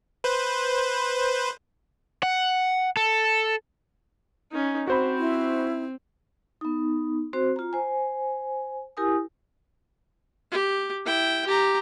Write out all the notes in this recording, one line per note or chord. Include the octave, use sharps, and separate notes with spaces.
B4 C5
F#5
A4
C#4 D#4
C4 F#4 C5 B5
E4
B3 D#4
C4 F#4 C5
F4 A#5
C5 G#5
E4 G4 A#4 G#5 D#6
G4
E4 G5
G4 A#5